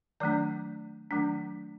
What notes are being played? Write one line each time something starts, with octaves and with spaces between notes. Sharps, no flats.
D#3 F#3 A3 D4 D5
D#3 F#3 A3 D4